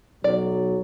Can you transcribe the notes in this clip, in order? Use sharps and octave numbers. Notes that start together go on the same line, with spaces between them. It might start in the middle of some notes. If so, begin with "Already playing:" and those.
B1 F#3 D5